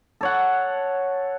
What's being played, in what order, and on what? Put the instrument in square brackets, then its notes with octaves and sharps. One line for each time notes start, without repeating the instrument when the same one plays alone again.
[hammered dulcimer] A4 C#5 F#5